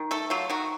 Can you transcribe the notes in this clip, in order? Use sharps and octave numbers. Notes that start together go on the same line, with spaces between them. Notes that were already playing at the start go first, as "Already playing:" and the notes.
Already playing: D#3
A3 A4
F#3 F4
D#3 F#4